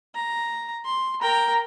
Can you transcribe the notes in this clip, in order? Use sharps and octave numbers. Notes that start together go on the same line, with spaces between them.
A#5
C6
A#4 G5 A#5